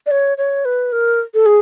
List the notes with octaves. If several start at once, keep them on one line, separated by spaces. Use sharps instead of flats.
D5
C#5
C#5
B4
A#4
A4
G#4